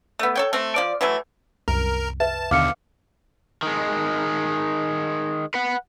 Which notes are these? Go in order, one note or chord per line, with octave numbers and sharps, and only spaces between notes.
A3 B3
A4 C#5 G5
A3 C4
F3 D5
E3 F#3 A3
C2 F#2 A#4
B4 E5 A5
D#2 B2 D3 F5 D6 F6 C#7
D#3 G#3
B4 F#5